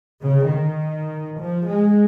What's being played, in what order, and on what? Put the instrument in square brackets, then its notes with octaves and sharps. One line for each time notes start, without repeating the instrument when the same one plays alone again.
[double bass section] C#3
D#3
F3
G#3